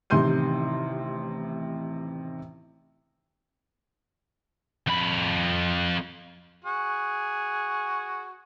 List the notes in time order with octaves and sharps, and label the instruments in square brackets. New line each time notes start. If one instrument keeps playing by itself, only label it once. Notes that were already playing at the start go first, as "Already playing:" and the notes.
[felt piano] A1 C3 D#3 C6 G6 D#7
[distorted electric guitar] F2 B5
[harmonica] F#4 G#4